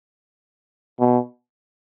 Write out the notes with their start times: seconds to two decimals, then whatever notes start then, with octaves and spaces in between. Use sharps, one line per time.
1.00 B2